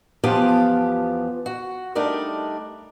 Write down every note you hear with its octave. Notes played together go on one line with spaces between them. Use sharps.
E2 F3 B3 F4 G4 A5
F#4
G3 A3 D4 D#4 A#4